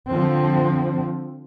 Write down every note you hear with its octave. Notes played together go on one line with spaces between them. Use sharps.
D3 F3 C4